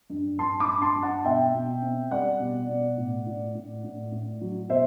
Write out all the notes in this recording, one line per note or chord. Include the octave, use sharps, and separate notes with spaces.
G2
G2 A5 C6
B5 D6
G2
A5 C6
G2
F#5 A5
B2 E5 G5
B2
C4
G3 D5 F#5
B2
B2
A2
A2
A2
A2
A2
F#3
B2 C5 E5